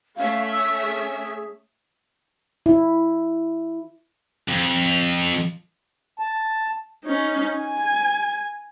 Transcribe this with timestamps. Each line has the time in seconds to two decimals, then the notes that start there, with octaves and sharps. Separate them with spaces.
0.17 A3 C#4 E5 F5
0.51 E6
0.82 G#4
2.66 E4
4.48 F2
6.20 A5
7.04 C#4 D#4
7.58 G#5